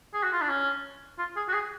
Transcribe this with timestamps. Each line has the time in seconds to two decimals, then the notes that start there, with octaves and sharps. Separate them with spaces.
0.14 G#4
0.23 F#4
0.33 F4
0.41 D4
0.50 C#4
1.19 F4
1.36 G#4
1.49 F#4
1.54 G#4